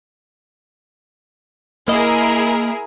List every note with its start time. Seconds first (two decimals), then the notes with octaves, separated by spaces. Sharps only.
1.88 A#3 E4 G#4 A#4 D#5